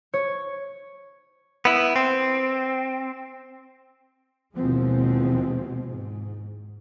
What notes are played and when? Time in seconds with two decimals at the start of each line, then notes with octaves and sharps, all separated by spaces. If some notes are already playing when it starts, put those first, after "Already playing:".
0.14 C#5
1.65 B3 E4
1.96 C4
4.56 D#2 B2 E3 F3 G#3 C4
5.87 G#2